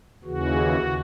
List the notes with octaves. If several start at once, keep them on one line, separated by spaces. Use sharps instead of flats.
D#2 C#3 E3 F#4